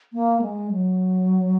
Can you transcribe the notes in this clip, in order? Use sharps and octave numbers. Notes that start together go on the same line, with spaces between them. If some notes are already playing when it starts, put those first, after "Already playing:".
A#3
G#3
F#3